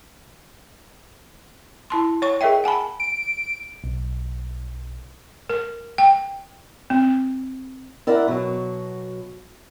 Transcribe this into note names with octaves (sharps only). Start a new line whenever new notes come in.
E4 A5 C6
C#5 C#6
G#4 A#4 D#5 E5 G5
F#5 G#5 A5 B5
D7
B1
A#4
G5
C4
E4 A#4 D5 E5 F#5
B2 F#3